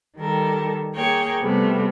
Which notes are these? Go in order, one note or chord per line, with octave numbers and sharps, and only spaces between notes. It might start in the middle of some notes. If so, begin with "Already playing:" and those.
D#3 G3 A4 A#4
A#3 G#4 C#5 G5
C3 G3 A3 B3